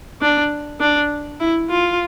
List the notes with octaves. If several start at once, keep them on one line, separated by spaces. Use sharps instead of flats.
D4
D4
E4
F4